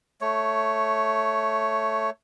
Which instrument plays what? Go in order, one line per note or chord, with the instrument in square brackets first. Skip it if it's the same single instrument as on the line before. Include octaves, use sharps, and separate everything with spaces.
[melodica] A3 C#5